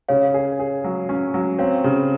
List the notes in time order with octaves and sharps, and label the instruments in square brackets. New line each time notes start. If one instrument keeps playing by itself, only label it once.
[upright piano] C#3 [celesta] C#5 F5
[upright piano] G#4
G#4
F#3
C#4
F#3
[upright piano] C4 [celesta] C#5 F5
[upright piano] C#3